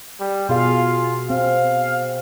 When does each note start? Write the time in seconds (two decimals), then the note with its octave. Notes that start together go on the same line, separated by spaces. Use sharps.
0.20 G3
0.49 B2 F4 G#4 F5
1.30 C4 F5